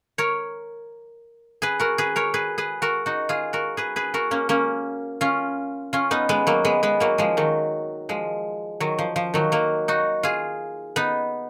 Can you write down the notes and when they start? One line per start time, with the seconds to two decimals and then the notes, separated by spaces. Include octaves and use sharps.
0.18 A#4 C#5
1.62 G#4 B4
1.80 F#4 A#4
1.98 G#4 B4
2.16 A#4 C#5
2.34 G#4 B4
2.58 G#4 B4
2.82 F#4 A#4
3.06 D#4 F#4
3.29 F4 G#4
3.53 F#4 A#4
3.77 G#4 B4
3.96 G#4 B4
4.14 F#4 A#4
4.31 A#3 C#4
4.49 A#3 C#4
5.21 C#4 F4
5.93 C#4 F4
6.11 B3 D#4
6.29 G#3 B3
6.47 F#3 A#3
6.65 G#3 B3
6.83 G#3 B3
7.00 F#3 A#3
7.18 F3 G#3
7.37 D#3 F#3
8.09 F3 G#3
8.80 D#3 F#3
8.99 F3
9.16 F3
9.34 D#3 F#3
9.52 F#3 A#3
9.88 D#4 F#4
10.23 F4 G#4
10.96 B3 D#4